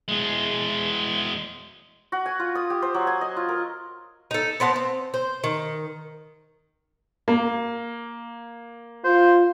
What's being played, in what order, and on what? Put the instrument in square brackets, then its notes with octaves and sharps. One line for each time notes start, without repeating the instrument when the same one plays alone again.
[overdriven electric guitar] E2 G#3
[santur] F#4
G#5
F4
D#6
G4
C5
F#3
G#5
D#5
F4
A#4
[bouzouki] D#4 A4
B3 C4 F#5 A5
C4
C5
D#3
[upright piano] A#3
[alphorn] F4 [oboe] C5